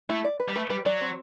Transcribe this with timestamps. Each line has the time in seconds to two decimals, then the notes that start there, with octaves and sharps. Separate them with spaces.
0.09 A3 E4
0.24 D5
0.40 B4
0.48 G3
0.56 A3 B4
0.70 G3 B4
0.86 F#3 D5
1.01 C4